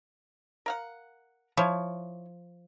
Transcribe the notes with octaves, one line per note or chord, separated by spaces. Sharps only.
A#4 F5 F#5
F3 E4 C#5